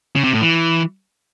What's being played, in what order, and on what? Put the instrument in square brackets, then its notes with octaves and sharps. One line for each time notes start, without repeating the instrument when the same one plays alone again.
[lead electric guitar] C#3
C3
A2
E3